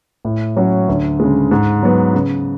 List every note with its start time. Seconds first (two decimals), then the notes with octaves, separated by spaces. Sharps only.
0.25 A2
0.57 F#3 C#4 F#4
0.88 D2
1.20 C#3 G#3
1.51 G#2
1.83 F#3 B3
2.13 C#3